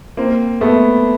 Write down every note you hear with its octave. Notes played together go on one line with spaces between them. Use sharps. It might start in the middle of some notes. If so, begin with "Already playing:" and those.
A#3 C4
A3 B3